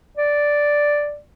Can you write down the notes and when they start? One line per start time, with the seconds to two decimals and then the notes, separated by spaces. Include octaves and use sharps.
0.17 D5